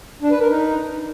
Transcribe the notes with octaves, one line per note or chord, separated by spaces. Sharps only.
D4
B4
A#4
D#4